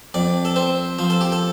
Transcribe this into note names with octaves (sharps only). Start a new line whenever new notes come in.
F2 D5
A4
C4 C5
F3 C5
A4
G4
A4